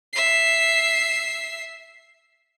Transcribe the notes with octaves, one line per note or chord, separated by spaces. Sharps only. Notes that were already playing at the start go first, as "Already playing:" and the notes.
E5 C7